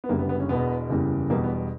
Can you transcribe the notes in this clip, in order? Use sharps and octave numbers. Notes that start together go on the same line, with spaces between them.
B3
F#1 F#2 D3 G3 A#3
B3
B3
C#4
E1 E2 B2 B3
F#1 E2 C#3 E3 G3
E1 E2 B2 G3 A#3
B3